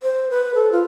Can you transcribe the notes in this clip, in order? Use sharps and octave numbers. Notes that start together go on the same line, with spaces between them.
C5
B4
A4
F4